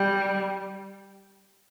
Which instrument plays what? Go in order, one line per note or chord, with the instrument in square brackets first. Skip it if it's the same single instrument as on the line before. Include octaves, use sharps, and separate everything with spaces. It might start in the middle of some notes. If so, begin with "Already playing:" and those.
Already playing: [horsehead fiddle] G3